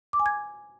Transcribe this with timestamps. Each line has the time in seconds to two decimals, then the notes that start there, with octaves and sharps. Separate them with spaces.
0.13 D6
0.19 G#5
0.26 G#6